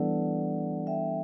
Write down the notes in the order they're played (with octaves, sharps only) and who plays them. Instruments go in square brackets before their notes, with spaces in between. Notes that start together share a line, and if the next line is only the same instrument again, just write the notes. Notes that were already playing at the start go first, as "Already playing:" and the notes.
Already playing: [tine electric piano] E3 G3 B3 D4 A4 [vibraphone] D5 F#5
[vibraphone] E5 G5